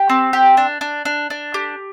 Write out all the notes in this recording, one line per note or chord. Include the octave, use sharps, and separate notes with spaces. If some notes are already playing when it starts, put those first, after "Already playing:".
Already playing: G4
C4
G4
D4
D4
D4
D4
G4